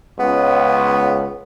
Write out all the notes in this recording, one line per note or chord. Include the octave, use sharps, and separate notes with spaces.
C#2 B3